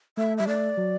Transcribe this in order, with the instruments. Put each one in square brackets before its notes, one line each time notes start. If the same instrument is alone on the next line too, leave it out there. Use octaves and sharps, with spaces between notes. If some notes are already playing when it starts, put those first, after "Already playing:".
[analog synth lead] A3 [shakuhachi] E5
[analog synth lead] G3 [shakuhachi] E5
[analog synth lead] A3 [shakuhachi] D5
[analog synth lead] F#3